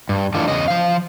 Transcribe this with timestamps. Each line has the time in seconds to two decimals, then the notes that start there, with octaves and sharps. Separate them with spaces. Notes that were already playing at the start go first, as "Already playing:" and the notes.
0.09 G2
0.34 A2 D#3 E3 D4 F4 A4
0.48 E2 C#3 D#5
0.68 F3 F5